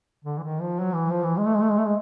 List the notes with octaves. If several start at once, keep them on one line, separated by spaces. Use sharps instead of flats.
D3
E3
D#3
F3
F#3
E3
F3
E3
G#3
A3
G#3
A3
G#3
A3
G#3